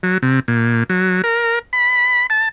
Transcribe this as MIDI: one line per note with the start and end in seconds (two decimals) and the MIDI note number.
0.03 0.18 54
0.23 0.40 48
0.48 0.83 46
0.89 1.22 54
1.24 1.59 70
1.73 2.27 83
2.30 2.48 81